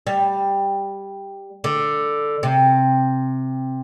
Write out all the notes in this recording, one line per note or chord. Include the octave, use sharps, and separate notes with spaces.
G3
D3
C3